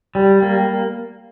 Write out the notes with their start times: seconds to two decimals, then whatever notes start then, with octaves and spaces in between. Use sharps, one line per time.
0.15 G3
0.42 A#3